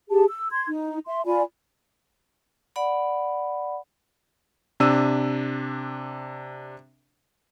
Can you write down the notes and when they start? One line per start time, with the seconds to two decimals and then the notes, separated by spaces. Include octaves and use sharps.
0.10 G4 G#4 A5
0.28 E6
0.51 C6 G#6
0.69 D#4
1.07 E5 C6
1.25 F4 D5 G#5 B5
2.76 D5 F#5 B5
4.80 C3 D4 E6 D#7